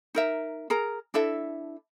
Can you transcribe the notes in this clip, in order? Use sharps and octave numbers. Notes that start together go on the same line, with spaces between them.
D#4 A#4 E5
G#4 A#4 A#5
D4 E4 A4 E5